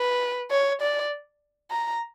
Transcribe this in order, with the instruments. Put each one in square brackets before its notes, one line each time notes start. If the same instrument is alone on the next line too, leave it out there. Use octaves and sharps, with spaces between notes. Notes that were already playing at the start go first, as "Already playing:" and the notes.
Already playing: [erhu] B4
C#5
D5
A#5